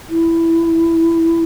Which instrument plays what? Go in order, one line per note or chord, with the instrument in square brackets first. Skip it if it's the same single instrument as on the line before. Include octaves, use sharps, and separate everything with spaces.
[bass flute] E4